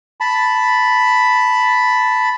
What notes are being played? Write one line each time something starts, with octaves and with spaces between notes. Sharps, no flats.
A5 B5